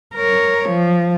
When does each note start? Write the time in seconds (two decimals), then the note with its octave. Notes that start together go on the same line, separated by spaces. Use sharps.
0.15 A#4 C#5
0.69 F3